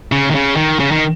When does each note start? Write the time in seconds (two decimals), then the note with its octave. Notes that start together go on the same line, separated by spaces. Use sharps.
0.12 C#3
0.31 D#3
0.35 C#3
0.57 D#3
0.79 C#3
0.92 D#3